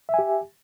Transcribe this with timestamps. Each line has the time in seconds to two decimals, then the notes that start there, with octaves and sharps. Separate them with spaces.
0.09 E5
0.14 G#5
0.19 G4